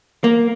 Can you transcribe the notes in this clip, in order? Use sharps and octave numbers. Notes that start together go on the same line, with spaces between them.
A#3